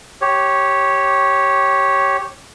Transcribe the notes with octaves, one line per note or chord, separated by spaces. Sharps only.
G4 C#5